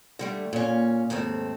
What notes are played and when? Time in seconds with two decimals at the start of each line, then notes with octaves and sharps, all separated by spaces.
0.19 D3 G3 A3
0.53 A#2 C#4
1.10 D#2 G#2 A3 C4